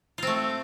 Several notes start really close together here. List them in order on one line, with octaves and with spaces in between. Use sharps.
F4 C4 A3